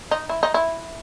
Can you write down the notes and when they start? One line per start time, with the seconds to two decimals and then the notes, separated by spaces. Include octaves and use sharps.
0.11 D#4
0.29 E4
0.43 D#4
0.54 E4